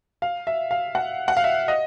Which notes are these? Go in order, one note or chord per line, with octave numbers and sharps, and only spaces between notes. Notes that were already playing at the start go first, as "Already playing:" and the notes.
F5
E5
F5
F#5
F#5
F5
E5
D#5